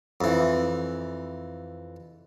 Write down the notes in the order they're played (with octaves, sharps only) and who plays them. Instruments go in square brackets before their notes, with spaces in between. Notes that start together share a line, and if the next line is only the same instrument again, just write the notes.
[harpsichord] F2 E3